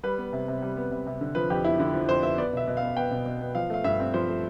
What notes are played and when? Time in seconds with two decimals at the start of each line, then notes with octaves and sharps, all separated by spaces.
0.03 G3 B4
0.18 B3
0.33 C3
0.48 C3
0.62 G3
0.77 B3
0.91 C3
1.06 C3
1.21 D3
1.35 F3 B4
1.50 F2 G4
1.64 B3 E4
1.79 D3 E4
1.94 F3
2.09 F2 C5
2.23 B3 E5
2.38 B3 D5
2.53 B2 E5
2.67 B2
2.77 F5
2.82 B3
2.96 B3 G5
3.11 B2
3.26 B2
3.41 B3
3.55 F3 F5
3.70 A3 F5
3.84 G2 E5
4.00 C4
4.14 F3 C5
4.29 A3